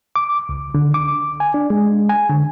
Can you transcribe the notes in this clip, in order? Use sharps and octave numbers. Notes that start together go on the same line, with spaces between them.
D6
C#2
D3
D6
G#5
D4
G#3
G#5
D3